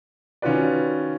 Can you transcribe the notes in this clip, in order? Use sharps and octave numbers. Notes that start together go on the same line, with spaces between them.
D#3 C#4 F4 F#4 B4 D5